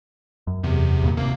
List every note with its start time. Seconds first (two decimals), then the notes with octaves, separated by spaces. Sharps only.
0.47 F#2
0.64 E2 C3
1.02 D2 G2 A#2
1.17 G#1 C3 A#3